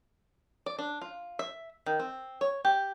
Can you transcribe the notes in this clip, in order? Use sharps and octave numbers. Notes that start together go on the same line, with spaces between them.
D5
D4
F4
E5
D#3
C4
C#5
G4